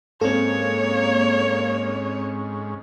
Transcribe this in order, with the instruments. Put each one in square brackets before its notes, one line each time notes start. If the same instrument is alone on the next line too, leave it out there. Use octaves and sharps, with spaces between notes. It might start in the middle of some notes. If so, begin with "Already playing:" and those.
[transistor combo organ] G#2 C#4 [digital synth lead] A#3 [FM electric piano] C4 A4 [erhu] C#5